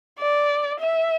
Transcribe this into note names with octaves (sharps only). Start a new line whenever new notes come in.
D5
E5